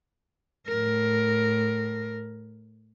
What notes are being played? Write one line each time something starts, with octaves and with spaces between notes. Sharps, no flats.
A2 A#4